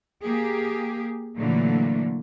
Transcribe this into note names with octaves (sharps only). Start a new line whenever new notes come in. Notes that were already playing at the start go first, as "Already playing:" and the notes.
A#3 G4 G#4
A#2 D3 E3 F#3 A3 A#3